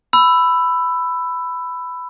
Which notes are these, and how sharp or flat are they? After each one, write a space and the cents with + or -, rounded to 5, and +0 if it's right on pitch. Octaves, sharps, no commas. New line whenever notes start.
B5 +10 E6 +10